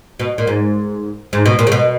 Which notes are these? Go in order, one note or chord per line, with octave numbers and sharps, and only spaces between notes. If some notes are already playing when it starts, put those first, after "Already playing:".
B2
A#2
G#2
G#2
B2
A#2
C#3
B2